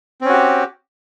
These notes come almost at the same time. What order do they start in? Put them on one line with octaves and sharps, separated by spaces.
C4 C#4 F#4 G4